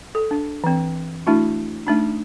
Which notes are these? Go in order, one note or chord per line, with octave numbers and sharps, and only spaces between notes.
A4
D4
E3 C4
A3 D4 E4 F#4
A3 D4 D#4